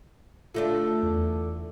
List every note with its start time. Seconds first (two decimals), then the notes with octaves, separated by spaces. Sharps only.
0.54 D3 A3 D4 F4
1.02 E2